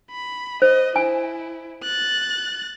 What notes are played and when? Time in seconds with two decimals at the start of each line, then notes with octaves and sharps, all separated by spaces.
0.11 B5
0.62 C5 D#5
0.96 E4 G#5
1.83 F#6 A6